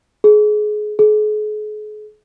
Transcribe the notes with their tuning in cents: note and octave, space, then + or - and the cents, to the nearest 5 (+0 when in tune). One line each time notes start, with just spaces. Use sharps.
G#4 +25
G#4 +40